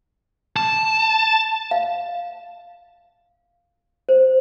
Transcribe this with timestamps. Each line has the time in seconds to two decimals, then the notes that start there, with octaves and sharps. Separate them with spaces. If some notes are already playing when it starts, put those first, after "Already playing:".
0.57 A5
1.71 F5
4.09 C5